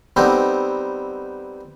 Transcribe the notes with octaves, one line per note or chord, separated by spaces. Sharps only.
G3 B3 C4 D#4 A4